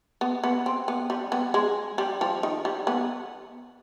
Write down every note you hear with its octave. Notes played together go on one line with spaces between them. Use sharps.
B3
B3
C4
B3
G3
B3
G#3
G3
F3
D#3
G3
B3